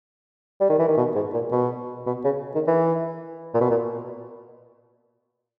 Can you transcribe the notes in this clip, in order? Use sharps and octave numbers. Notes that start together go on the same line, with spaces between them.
G3
D#3
E3
D#3
B2
G#2
A#2
B2
B2
C#3
D#3
E3
A#2
B2
A#2